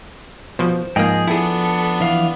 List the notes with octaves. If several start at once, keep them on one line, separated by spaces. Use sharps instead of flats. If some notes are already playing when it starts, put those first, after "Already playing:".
B2 F3 C5
G#2 F3 A#3 G#4 D#5 G5
B3 D4 E4 G#4 A4
E3 F5